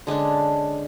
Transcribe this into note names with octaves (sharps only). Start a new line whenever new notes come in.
D3 G#3 C#4 D4